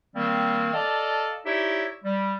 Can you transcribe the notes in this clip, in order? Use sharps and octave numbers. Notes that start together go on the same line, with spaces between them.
D#3 G3 A#3 C4
A4 D5 D#5 F5 A5
D#4 E4 G4 C#5 D5 E5
G3